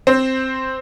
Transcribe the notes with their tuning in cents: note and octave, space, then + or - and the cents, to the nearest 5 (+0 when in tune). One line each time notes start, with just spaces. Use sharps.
C4 +0 C5 +0